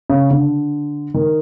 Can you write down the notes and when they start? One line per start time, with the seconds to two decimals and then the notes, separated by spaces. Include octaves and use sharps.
0.10 C#3
0.31 D3
1.14 D#3